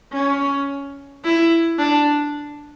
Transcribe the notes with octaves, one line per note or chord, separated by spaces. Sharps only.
C#4
E4
D4